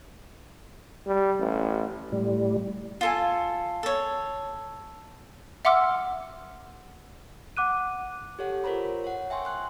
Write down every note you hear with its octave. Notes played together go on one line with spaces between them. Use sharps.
G3
A1
A2 G3
F4 A4 G#5
A4 C#5
E5 F#5 C6 D6 E6 F6
F#5 D6 F#6 D#7
G4 A4 C#5 F#5
F4 A#4 C5 C#5 A#5 B5
C#5 F#5
E5 G5 G#5 C6 C#6
C6 F#6